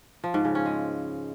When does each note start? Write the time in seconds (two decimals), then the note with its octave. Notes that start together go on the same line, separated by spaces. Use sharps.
0.24 F3
0.34 G#2
0.45 C#3
0.55 C#4
0.66 G#3